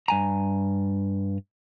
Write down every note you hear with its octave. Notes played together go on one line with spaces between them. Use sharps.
G2 G#5 A#5